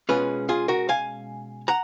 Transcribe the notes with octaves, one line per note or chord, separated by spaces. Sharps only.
B2 G#3 C#4 F4 G#4 B4
F4 G#4
F#4 A#4
F5 G#5
F#5 A#5